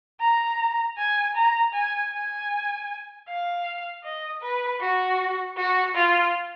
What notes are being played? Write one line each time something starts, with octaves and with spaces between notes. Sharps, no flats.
A#5
G#5
A#5
G#5
G#5
F5
D#5
B4
F#4
F#4
F4